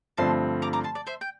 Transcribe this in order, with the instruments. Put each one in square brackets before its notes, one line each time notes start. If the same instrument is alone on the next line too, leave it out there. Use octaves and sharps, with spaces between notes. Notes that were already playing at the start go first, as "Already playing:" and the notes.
[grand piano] G2 D3 F3 A3 C4 [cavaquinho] A5 C6
[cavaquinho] A#5 D6
A#5 D6
A5 C6
D5
C5 E5
G5